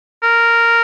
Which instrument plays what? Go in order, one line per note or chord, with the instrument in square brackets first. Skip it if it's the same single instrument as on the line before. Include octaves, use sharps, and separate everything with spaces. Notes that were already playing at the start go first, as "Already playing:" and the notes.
[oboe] A#4